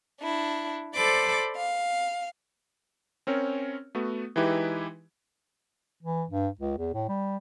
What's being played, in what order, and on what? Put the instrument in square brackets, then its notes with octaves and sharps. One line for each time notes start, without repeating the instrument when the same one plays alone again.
[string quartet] D4 E4
A4 C5 D5 B5 D6
F5
[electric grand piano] C4 C#4 A#4 C#5
A3 B3 F#4
E3 G#3 D#4 E4 G4 B4
[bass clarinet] E3
G2
C#2
E2
A2
G3